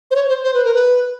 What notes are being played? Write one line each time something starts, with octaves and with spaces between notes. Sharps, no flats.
C5
C#5
C5
C5
B4
A#4
B4